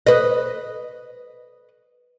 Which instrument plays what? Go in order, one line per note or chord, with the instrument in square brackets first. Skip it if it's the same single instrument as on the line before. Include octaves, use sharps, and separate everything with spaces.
[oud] B4 D#5